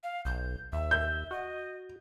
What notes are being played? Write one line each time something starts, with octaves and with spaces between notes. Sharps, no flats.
F5
B1 G6
D#2 E5
G6
F#4 D#5